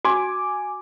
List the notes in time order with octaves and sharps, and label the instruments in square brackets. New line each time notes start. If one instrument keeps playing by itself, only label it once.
[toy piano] F#4 [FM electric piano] G#5 D6